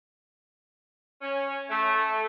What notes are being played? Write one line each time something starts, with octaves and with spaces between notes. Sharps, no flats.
C#4
A3